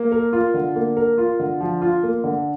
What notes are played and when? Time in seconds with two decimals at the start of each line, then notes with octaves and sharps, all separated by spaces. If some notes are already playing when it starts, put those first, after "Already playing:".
Already playing: A#3
0.12 A#4
0.33 F4
0.54 D3
0.76 A#3
0.97 A#4
1.18 F4
1.40 D3
1.61 F3
1.82 F4
2.03 A#3
2.24 D3